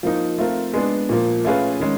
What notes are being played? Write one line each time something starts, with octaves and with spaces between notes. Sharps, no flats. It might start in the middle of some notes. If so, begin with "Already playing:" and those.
F3 A#3 D#4
A3 C4 F4 A#4
G#3 B3 D4
A#2 F3 A#3
A3 C#4 F4 G#4 B4
D#3 G#3 C#4